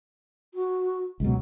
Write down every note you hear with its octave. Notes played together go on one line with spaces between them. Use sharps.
F#4
C#2 B2 F#3